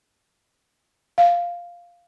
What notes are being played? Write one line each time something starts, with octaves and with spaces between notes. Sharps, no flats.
F5